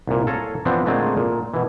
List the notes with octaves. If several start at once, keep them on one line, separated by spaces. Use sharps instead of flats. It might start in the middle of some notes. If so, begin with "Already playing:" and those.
C2 A#2
A4 C#5 F5 G#5 A#5
E3 F3 B3 C4 D4
A#2 D3 G#3 A3 C4 G#4
A#2
B2 E3